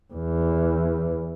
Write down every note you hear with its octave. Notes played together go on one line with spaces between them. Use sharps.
E2